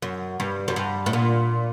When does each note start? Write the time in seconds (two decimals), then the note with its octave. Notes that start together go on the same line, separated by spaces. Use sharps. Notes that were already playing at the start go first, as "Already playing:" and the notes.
0.02 F#2
0.40 G2
0.68 F#2
0.76 G2
1.06 A2
1.13 A#2